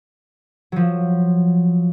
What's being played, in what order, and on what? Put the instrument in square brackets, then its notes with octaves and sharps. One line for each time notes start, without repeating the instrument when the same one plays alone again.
[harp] F3 F#3